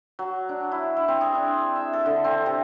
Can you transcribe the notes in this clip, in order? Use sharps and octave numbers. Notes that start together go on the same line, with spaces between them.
F#3
D4
E4
E4
C4
G#4
D4
E5
A4
D3
C4
C3